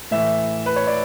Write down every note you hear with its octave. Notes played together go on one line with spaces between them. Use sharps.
A2 E3 E5
B4
C#5
D5